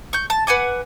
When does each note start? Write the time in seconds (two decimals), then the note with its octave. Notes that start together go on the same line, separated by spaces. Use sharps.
0.13 C#6 G6
0.30 A5
0.47 B4 F#5 G#5 D6